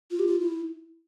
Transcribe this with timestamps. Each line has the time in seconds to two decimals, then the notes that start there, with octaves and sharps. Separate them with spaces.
0.11 F4
0.19 G4
0.27 F4
0.40 E4